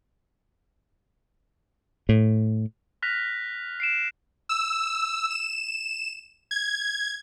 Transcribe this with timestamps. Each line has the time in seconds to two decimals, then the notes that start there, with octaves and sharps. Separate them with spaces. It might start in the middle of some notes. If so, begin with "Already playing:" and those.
2.09 A2
3.02 F6 F#6 A#6 B6 F7
3.80 C7 D7 E7
4.49 E6
5.30 E7
6.51 G#6